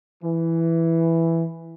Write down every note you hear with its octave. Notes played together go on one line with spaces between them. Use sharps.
E3